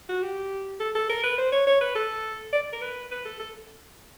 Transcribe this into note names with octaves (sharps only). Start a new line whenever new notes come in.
F#4
G4
A4
A4
A#4
B4
C5
C#5
C#5
B4
A4
D5
A#4
B4
B4
A4
A4